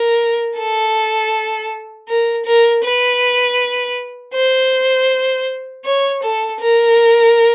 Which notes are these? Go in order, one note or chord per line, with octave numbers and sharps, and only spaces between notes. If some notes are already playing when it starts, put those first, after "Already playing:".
Already playing: A#4
A4
A#4
A#4
B4
C5
C#5
A4
A#4